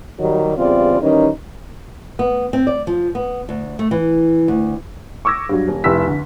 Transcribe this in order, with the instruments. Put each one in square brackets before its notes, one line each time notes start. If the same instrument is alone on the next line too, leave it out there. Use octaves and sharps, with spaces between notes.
[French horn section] D#3 F#3 G3
E2 C#3 G3 C4 F4 D5
D#3 E3 G3 C#4 D#4
[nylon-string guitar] B3
C4
D5
F3
B3
D2
A3
E3
D2
[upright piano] C#6 D6 E6 G#6 A#6
G2 F#3
D#1
F1 E4 G4 E6 B6
D2